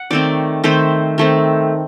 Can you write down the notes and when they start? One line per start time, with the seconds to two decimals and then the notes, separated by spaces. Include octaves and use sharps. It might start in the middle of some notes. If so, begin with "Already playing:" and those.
Already playing: F#5
0.11 D#3 A3 C4 D5
0.64 D#3 A3 C4 C5
1.18 D#3 A3 C4